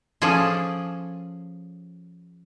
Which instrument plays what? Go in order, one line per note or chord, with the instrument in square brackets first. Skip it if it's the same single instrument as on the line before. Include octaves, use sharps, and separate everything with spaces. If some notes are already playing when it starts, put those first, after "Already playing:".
[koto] F3 C#4 G#4 A4 D5